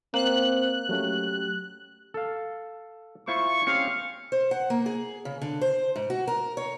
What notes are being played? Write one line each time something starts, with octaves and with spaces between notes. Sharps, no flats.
A#3 C4 F#6
F#3 A3 C#4 G4
A4 F5
E4 F4 C5 C#6
C4 C#4 G4 F5 C#7
C5
F#5
A#3
G#4
C#3
D3
C5
G#2
F#4
A#4
C#5